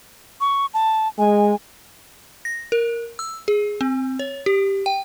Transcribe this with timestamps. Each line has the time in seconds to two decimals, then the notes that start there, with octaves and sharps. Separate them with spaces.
0.41 C#6
0.74 A5
1.18 G#3 G#5
2.45 A#6
2.72 A#4
3.19 E6
3.48 G#4
3.81 C4
4.19 C#5
4.46 G4
4.86 G5